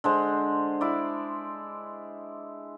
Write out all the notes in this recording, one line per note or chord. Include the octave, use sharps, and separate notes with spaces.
D3 G#3 C5
E4 D5